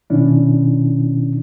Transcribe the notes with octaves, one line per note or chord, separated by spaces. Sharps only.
B2 D#3 C#4 D4 E4